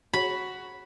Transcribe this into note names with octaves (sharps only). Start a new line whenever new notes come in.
F#4 B5